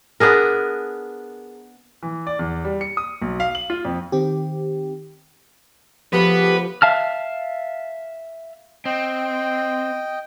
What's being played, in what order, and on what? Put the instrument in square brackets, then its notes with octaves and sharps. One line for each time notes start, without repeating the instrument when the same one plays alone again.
[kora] B3 D4 G#4 A#4
[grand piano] E3
D5
E2
G3
C#7
D#6
B1
F5
F#7
F4
F2
[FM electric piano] D#3 C4 G4
[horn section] C#3 A3 B3 [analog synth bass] F3 [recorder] G4 [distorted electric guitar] B4
[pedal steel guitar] E5 F5 A5 F6
[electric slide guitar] C4 [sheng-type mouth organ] D#5 G5